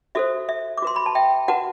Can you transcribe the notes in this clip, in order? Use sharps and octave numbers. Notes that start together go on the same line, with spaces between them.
F#4 A4 C5 E5
E5
D6
F#4 B4 C6
B5
A5
E5 G5
F#4 B4 F#5 A5